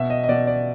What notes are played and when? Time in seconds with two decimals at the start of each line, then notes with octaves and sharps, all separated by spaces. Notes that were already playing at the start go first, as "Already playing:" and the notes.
Already playing: B2 E5
0.10 D#5
0.24 D#5
0.29 B2 D5
0.47 D5